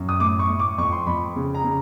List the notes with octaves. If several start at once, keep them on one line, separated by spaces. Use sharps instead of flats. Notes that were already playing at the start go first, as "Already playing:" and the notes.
Already playing: F#2
D#6
A2 D6
C#6
A2
D6
F2 C#6
C6
F2 B5
C#3
A#5
C#3